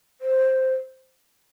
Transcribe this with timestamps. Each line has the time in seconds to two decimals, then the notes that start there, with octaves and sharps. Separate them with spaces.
0.21 C5